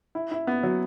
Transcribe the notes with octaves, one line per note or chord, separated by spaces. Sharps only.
E4
E4
B3
F#3